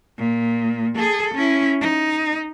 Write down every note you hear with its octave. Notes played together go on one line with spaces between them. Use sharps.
A#2
G#4 A4
C#4 E4
D#4